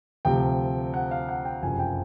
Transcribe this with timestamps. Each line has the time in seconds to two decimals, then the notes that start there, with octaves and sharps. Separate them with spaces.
0.25 D2 C3 F3 G5
0.94 F#5
1.11 F5
1.29 F#5
1.45 G5
1.62 F#1 F2 C3 F3 G#5
1.79 G5